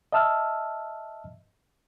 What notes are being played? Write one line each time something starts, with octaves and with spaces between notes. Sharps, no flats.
D#5 E5 A5 E6 F6